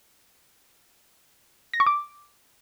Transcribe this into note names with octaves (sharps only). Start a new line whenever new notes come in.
A#6
C#6
D6